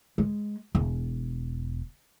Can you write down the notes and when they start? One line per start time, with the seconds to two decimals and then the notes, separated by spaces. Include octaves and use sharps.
0.18 G#3
0.75 E1